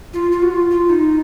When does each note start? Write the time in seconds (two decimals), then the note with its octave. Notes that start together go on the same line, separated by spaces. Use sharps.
0.13 F4
0.32 F4
0.42 F#4
0.51 F4
0.70 F4
0.90 D#4